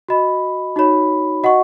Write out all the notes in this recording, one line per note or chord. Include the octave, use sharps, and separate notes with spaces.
F#4 D#5 B5
D#4 F#4 C#5 B5
F#4 D#5 F#5 C#6